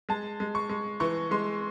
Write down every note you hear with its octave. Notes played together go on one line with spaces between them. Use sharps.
G#3 A5
G#3
C#6
G#3
E3 C#6
G#3 C6